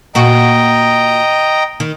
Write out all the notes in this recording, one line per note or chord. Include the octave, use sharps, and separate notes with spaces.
A#2 F#4 D#5 G5 A#5
D#3